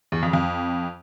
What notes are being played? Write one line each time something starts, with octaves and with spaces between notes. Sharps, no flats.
E2
F2
F2